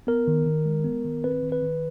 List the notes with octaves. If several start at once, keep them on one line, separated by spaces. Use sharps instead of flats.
B3 A#4
D#3
D#3
G#3
B3
D#3
C4 B4
D#3
B4
D#3